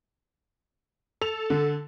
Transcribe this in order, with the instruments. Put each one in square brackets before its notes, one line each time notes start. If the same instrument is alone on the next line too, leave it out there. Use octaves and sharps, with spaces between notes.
[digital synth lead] A4 [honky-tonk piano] F7
[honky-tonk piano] D3